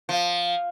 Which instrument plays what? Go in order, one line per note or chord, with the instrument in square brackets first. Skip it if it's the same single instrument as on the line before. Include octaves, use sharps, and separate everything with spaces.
[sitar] F3